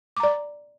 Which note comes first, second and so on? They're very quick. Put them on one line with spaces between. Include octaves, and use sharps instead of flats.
D6 A#5 D5